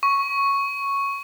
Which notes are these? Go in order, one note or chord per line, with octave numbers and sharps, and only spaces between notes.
C#6